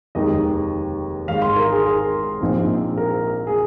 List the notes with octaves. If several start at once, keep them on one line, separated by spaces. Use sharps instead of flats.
F1 D#2 D#3 G#3 D#5
G#1 G#2 D#3 G#3 F5
C6
A#4
G#4
A#4
A#1 A#2 F3 C4 D#4
A#4
G#4